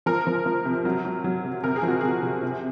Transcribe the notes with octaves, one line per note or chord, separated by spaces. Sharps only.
F3 A#4
F3
F3
C3
F#3
F#3
F#3
C3
C3 A#4
G#4
F3
F#4
C3 G#4
C3
C3